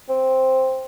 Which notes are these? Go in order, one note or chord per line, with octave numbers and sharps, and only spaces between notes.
C4